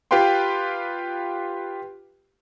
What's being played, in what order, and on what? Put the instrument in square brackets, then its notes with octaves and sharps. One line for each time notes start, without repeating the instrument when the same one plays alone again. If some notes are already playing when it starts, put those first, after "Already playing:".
[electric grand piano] F4 G4 B4 F5 G5 C6